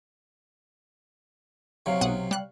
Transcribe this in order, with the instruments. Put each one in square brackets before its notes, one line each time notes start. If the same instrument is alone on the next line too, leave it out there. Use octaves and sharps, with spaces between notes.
[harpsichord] C3 F#3 [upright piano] C#5 F5
[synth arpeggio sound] B1 F#5 D#6
G3 F#6